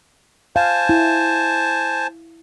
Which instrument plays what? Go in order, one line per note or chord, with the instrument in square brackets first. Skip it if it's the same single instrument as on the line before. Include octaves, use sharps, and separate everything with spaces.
[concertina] C5 G#5 A5 [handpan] F5
[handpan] E4